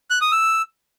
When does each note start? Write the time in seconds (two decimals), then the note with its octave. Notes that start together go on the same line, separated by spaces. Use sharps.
0.10 F#6
0.21 D#6
0.32 E6